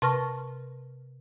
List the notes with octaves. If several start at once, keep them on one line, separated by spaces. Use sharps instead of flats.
C3 B4 A5 C#6 F6 A#6